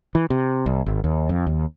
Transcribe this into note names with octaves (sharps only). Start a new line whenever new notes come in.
E3
C3
C2
G#1
D#2
F2
D#2